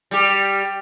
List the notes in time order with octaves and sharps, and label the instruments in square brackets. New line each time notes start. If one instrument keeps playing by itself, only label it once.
[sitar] G3 G4